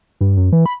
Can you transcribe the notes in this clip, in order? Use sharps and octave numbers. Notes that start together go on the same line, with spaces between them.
G2
F#2
E3
B5